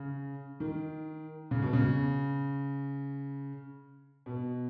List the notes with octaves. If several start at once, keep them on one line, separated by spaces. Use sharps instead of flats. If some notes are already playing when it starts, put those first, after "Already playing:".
Already playing: C#3
D#3
C#3
B2
C#3
B2